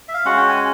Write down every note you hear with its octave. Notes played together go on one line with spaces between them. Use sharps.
E5
F5
G#3 C#4 F#4 F#5
G5
G#5